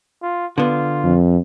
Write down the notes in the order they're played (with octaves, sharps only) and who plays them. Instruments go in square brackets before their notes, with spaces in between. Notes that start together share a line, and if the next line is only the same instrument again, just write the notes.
[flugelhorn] F4
[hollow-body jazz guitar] D3 B3 [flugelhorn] F4
[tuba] F2